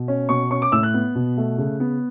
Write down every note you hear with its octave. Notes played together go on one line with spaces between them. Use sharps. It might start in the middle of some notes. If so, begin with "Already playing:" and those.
Already playing: B2
C#4
B2 C#6
C#4 C#6
D6
A2 E6
F#6
B3
B2
A3
C#3
B3